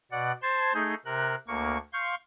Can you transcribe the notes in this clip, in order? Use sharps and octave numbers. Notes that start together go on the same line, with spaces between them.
B2 D5 F#5
C5 A5 C6 G#6
A3 D#4 G#4 G6
C3 A#4 F#6
D2 A#3 C#6
F5 C6 C#6 G6